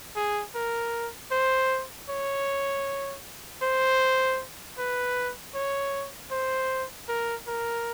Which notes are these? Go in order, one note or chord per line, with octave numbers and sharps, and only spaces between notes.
G#4
A#4
C5
C#5
C5
B4
C#5
C5
A#4
A#4